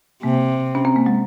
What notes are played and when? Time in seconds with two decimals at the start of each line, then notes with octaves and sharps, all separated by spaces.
0.23 C3 A#3
0.75 C#4
0.85 C4
0.96 A#3
1.06 G#3